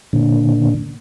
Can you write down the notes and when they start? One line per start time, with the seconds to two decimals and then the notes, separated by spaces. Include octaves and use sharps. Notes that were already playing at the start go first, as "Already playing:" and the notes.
0.13 A#2 D3